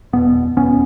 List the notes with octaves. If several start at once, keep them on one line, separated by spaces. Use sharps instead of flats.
F#1 E2 B2 B3
F#1 E2 B2 B3 C#4